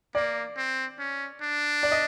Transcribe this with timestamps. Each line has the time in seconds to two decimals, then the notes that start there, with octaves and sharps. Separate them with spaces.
0.15 A#3 D5
0.56 C4
0.99 C#4
1.42 D4
1.83 D5
1.92 D#5